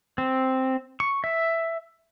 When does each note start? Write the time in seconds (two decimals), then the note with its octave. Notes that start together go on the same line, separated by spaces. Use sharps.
0.18 C4
1.00 C#6
1.24 E5